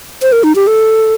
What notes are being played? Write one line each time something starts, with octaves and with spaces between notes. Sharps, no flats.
C5
A#4
D#4
G4
A4